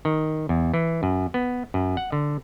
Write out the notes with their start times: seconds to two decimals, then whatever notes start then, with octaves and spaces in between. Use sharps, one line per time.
0.05 D#3
0.49 E2
0.74 E3
1.03 F#2
1.34 B3
1.74 F#2
1.97 F#5
2.12 D3